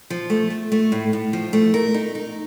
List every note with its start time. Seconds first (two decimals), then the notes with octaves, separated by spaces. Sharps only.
0.10 F3
0.30 A3
0.50 A3
0.72 A3
0.92 A2
1.13 A2
1.33 F3
1.53 A3
1.74 A#4
1.94 D#4
2.15 D#4